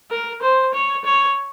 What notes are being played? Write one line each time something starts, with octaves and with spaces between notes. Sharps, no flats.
A#4
C5
C#5
C#5